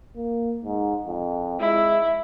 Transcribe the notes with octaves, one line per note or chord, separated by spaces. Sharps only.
A#3
G#2
F2
G#3 E4